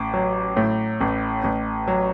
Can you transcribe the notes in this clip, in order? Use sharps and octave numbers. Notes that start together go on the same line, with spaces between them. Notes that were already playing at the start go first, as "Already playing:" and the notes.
Already playing: A1 D6
F#3
A2
A1
A1
F#3